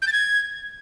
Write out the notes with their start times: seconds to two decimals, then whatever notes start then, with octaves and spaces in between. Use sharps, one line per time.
0.02 G6
0.07 A6
0.13 G#6